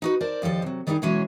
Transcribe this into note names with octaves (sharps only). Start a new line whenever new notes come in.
D#4 F#4 B4
A#4 C5 D5 A5
D#2 F3 G3 A4 D#5
C3 F#3
D#3 G3 B3 D4 D#4 G#4
B2 E3 F#3 G#3 C#4